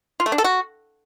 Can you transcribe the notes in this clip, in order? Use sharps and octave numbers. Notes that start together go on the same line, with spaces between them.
F4
A3
D4
A4
F#4